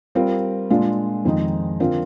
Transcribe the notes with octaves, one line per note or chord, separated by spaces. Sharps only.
G3 C4 F4 A#4
A#2 G#3 D4 F4
F2 D#3 G#3 C4 D#4
D3 F3 C4 F4 A#4